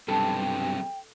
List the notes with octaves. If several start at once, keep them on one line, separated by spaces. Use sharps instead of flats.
B1 G2 C3 A4 G5